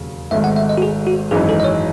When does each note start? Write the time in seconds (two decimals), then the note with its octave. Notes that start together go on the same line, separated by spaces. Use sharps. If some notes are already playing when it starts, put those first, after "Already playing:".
Already playing: E1 D#2 C#3 F#3
0.31 G#1 G#2 D#3 A3 E5
0.44 F#5
0.56 E5
0.69 D#5
0.78 F#4
0.82 G#4
1.07 F#4
1.31 G#1 F#2 E3 G#3 D#4 G#4
1.49 A4
1.60 D#5
1.64 C#5